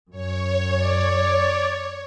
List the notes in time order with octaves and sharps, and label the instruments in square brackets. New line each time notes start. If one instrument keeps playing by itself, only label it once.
[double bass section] F#2 [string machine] C#5
[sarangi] D5